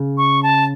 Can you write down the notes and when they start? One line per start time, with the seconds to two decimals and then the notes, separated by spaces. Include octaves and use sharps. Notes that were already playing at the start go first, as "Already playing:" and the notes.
Already playing: C#3
0.18 C#6
0.43 A5